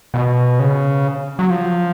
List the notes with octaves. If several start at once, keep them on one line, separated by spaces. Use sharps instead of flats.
B2
C#3
F#3
F3